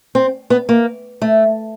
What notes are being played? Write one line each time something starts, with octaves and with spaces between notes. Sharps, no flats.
C4
B3
A#3
A3